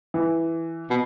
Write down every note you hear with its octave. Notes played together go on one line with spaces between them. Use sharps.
E3
B2